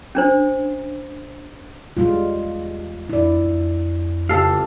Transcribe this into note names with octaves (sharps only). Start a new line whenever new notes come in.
C#4 D4 C5
E2 G3 G#3 F4
F2 E4 D5
F2
C#2 G4 A4 F5